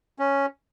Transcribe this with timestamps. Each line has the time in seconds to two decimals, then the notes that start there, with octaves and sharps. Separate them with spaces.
0.19 C#4